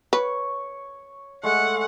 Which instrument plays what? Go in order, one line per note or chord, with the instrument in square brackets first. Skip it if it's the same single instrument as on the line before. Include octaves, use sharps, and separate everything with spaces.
[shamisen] B4 [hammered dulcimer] C#5
[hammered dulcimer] G#3 A3 [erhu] F#5